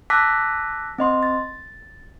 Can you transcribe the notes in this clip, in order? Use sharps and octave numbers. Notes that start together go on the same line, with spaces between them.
A5 D6 E6 F#6 A#6 B6
C4 D#5 C6
A6